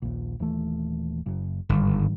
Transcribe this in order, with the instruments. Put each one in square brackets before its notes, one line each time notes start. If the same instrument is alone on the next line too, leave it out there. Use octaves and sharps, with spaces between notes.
[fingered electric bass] D#1 A#1
D#1 E3 A3
F#1
[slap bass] G1 [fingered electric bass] G#2 D#3 G3